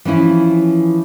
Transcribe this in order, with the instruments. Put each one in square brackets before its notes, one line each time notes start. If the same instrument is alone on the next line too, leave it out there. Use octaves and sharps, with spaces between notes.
[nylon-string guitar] E3 F3 C#4 E4